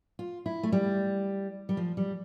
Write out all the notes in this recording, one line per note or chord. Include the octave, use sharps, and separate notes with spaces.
F4
E4
A3
G3
G3
F3
G3